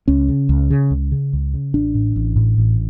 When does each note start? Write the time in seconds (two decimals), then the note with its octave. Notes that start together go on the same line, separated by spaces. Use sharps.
0.08 C#2 C#4
0.29 C#3
0.49 C#2
0.70 C#3
0.91 C#2
1.12 C#3
1.33 C#2
1.54 C#3
1.74 A1 D4
1.95 A2
2.16 A1
2.36 A2
2.58 A1